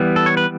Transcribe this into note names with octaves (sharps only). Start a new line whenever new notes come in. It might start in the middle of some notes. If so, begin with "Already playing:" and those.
Already playing: E3 G3 B3
A4
C#5
B4